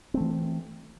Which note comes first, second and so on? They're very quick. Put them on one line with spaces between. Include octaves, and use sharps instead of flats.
C4 A3 E3